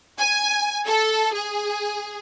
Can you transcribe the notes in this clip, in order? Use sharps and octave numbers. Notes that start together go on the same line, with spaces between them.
G#5
A4
G#4